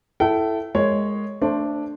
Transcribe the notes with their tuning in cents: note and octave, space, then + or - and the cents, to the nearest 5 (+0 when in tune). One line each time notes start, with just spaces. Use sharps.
E4 +10 A4 +0 G5 -35
G#3 +0 A#4 -10 C#5 +0
A3 +25 D4 +0 C5 +10